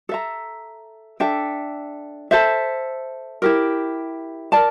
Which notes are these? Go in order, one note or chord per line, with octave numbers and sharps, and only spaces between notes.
A4 E5 A#5
D4 A4 E5 G5
A4 C5 E5
E4 G4 A#4
A#4 D5 A5